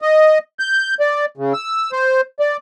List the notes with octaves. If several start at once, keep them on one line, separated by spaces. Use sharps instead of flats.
D#5
G6
D5
C#3
E6
C5
D5